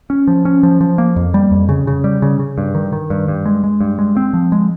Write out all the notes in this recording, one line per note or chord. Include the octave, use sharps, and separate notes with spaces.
C#4
F3
C#4
F3
F3
A#3
F2
G3
F2
C#3
C#3
G3
C#3
C#3
G2
D#3
D#3
G2
G2
G#3
G#3
G2
G#3
C4
F3
G#3